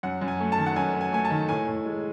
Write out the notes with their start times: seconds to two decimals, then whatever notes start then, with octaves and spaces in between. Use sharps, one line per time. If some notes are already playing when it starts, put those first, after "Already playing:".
0.03 F#2 F#5
0.21 F#2
0.28 G#5
0.40 A3
0.52 A5
0.58 D#3
0.66 F#5
0.76 F#2 G#5
0.94 F#2
1.01 G#5
1.12 A3 G#5
1.25 A5
1.30 D#3
1.49 A2 G#5
1.67 A2
1.85 G#3